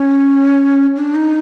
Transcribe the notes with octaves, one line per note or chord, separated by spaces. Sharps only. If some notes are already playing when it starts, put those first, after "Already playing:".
Already playing: C#4
D4
D#4